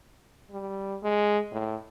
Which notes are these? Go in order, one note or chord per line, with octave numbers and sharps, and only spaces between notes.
G3
G#3
A2